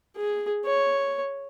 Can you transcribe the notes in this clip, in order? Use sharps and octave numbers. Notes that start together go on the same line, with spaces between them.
G#4
C#5